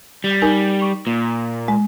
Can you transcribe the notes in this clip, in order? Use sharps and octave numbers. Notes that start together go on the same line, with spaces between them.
G3
D#4 A#4 G#5
C#6
A#2
G#3